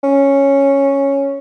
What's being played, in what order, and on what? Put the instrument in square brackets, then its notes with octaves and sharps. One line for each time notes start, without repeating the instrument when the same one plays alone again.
[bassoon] C#4